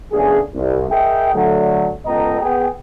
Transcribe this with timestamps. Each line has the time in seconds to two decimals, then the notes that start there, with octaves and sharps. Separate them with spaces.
0.12 C#3 F#3 A3 B3 D4 G#4
0.54 C2
0.91 G#4 A#4 D#5 E5 G5
1.34 D3 F#3 A3
2.06 C#2 B3 A4 D#5 G5 A#5
2.41 B3 G#4 G5